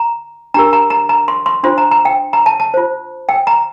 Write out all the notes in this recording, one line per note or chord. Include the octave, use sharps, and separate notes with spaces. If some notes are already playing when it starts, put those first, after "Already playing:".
Already playing: A#5
D4 G4 A#4 A#5
A#5
A#5
A#5
C6
C6
D4 F4 C5 C6
A#5
A#5
G5
A#5
A5
A5
F4 C5
G5
A#5